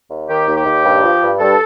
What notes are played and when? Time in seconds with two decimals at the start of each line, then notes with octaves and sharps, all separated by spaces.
0.10 D#2
0.28 D#3 G4
0.47 D#2
0.56 G4
0.65 D#2
0.84 G2
1.03 F3
1.21 G2
1.40 G2 A4